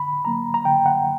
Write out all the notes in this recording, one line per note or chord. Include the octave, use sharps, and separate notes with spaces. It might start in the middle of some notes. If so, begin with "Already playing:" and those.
Already playing: D3 B5
F#3 A#3 A#5
A#5
D3 G5
F#5